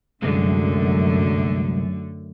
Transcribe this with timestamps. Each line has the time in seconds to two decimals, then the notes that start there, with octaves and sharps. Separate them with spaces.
0.22 C2 F#2 D3 G#3 A3